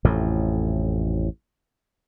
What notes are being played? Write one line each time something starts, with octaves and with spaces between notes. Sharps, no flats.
A1 F2 A2